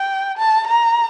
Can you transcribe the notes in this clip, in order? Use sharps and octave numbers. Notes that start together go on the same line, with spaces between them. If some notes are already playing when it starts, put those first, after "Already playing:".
Already playing: G5
A5
A#5